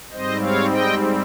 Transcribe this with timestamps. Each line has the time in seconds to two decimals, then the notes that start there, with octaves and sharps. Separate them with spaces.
0.12 G#2 G3 C4 C5 D#5
0.40 C#5 F5
0.69 D#5 G5